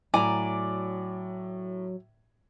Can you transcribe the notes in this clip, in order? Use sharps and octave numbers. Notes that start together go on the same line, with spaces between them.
A2 F#3 D5 G#5 A#5